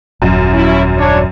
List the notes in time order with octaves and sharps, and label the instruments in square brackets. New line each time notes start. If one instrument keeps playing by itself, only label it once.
[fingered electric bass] D#1 [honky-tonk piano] F#2
[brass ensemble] C#4 E4
D4 C#5